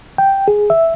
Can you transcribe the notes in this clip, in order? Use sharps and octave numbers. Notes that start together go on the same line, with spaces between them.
G5
G#4
E5